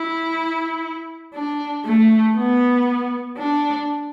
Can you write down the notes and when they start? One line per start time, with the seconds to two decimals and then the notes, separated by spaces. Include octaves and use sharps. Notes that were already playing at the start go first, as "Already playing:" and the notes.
Already playing: E4
1.34 D4
1.85 A3
2.36 B3
3.38 D4